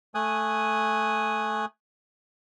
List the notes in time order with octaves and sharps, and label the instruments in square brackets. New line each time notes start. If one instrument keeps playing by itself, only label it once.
[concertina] A3 G#5 D#6 F#6